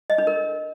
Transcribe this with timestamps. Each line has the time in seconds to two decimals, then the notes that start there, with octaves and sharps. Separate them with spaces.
0.10 D#5
0.18 D4
0.27 A#4